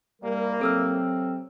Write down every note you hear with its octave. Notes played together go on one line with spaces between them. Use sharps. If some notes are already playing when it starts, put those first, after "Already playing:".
C2 G3 A#3 A#4
C3 F#3 C4 A4 E6 F6